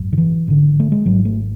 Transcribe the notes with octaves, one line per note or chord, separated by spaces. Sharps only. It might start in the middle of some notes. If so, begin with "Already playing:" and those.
Already playing: G#1 F#2
D3
E3
G#1 F#2 D3
A3
G#3
G#1 G#2 F#3
A3